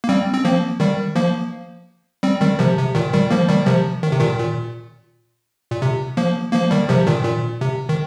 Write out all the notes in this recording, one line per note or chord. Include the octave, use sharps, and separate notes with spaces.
A#3
G3 C4
C4
F3 A#3
D#3 G3
F3 A#3
G3 C4
D#3 G3
C3 F3
C3
A#2 D#3
D#3 G3
F3 A#3
D#3 G3
C3 F3
D#3
C3
A#2 D#3
A#2
A#2
C3
F3 A#3
F3 A#3
D#3 G3
C3 F3
A#2 D#3
A#2
C3
D#3